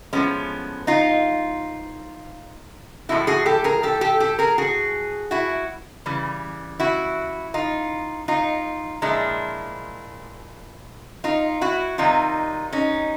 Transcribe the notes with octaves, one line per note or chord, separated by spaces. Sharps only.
A2 F3 G#3 B3 C#4
D#4 F4
A2 F3 G#3 E4 F#4
F#4 G#4
G4 A4
G#4 A#4
G4 A4
G4 A4
G4 A4
G#4 A#4
F#4 G#4
E4 F#4
C#3 E3 G3
E4 F#4
D#4 F4
D#4 F4
A#2 F3 G#3 D4 E4
D#4 F4
E4 F#4
C3 D#3 G3 D#4 F4
C#4 D#4